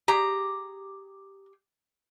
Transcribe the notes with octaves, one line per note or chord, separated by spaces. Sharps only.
G4 G#4 A#5